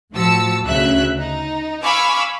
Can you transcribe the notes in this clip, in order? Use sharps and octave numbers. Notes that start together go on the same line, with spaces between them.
A2 F3 F#4 A5 E6 C#7
D2 C#3 F#3 E5 F#6
D#4
F5 G#5 B5 C#6 D6 E6